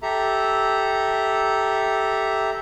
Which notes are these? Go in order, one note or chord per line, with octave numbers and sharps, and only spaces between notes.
G4 A4 E5 A#5